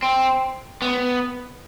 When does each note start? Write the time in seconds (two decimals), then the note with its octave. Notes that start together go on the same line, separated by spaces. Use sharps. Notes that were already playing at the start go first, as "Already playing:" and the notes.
0.02 C4
0.82 B3